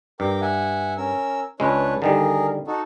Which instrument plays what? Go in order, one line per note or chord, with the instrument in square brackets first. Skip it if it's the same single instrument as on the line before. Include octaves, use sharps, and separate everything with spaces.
[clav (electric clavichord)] G2 [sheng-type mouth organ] A#4 G5 D6
[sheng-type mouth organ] E5 F#5 G#5
C#4 A#4 E6
[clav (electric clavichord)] C#2 G#3 [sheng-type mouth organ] D4 B4 C#5
[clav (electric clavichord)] D3 D#3 G3 [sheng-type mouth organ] G#4 A#4
[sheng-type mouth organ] D#4 F#4 A4